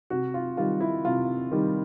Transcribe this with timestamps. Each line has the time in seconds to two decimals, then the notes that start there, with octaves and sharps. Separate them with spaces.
0.10 C3 F#4
0.34 F4
0.57 D#3 G3 F4
0.80 E4
1.05 C3 F4
1.51 D#3 G3